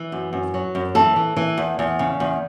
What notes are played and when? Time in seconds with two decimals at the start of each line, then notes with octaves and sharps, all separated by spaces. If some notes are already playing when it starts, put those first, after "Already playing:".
Already playing: E3
0.12 F#2
0.33 F#2
0.54 F#3
0.75 F#2
0.95 E3 A4
1.16 E3
1.36 E3
1.58 E2
1.79 E2
1.99 C#3
2.20 E2